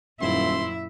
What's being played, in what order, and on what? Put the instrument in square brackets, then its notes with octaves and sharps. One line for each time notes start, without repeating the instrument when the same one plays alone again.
[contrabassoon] D#1 [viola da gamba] F#2 A#2 E4 [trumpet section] C5 C6 [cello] E5